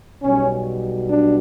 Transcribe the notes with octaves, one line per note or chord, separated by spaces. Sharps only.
B1 B2 G3 C#4
D4